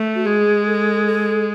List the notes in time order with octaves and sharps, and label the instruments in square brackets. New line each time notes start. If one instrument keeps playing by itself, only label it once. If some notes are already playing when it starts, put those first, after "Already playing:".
Already playing: [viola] A3
[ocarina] F#4
[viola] G#3 [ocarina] G#4
[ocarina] A4
A4